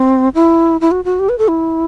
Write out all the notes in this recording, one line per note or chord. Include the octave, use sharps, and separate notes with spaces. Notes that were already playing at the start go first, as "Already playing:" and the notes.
Already playing: C4
E4
E4
F#4
F#4
G4
B4
A4
E4